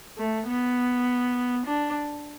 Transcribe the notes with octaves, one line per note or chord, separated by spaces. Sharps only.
A3
B3
D4